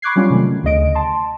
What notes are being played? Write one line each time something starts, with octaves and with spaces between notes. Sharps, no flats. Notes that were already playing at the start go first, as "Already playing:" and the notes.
B5 C#6 D6 F#6 G#6 C7
F#3 G3 C#4 F4
C3 D#3 A3
D2 C#3 D#5 D7
A5 C6